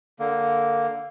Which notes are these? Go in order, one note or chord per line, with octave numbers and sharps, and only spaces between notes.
D3 A#3